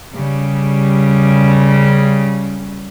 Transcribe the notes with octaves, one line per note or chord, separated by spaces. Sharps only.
C#3 G3